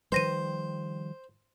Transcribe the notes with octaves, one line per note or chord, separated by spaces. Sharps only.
D#3 F3 G3 B4 C5 A#6 D#7